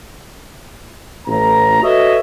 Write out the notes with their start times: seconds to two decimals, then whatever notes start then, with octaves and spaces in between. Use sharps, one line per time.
1.27 A1 A#5
1.82 F#4 A4 B4 C#5 D#5 E5